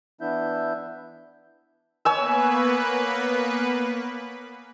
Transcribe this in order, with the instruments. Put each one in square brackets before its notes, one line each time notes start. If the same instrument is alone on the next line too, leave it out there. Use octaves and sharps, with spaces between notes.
[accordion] E3 B3 D4 E4 E5 G6
[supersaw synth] A#3 B3 B4 [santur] C#5 G#5 E6